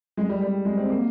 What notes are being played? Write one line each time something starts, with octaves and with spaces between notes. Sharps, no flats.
G#3
G3
G3
G#3
C4
A#3